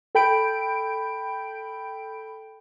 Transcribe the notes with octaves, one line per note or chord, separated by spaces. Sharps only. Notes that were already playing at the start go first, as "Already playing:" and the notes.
A4 G5 B5 G6 D7